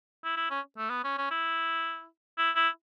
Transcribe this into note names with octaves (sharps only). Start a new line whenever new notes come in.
E4
E4
C#4
A3
B3
C#4
C#4
E4
E4
E4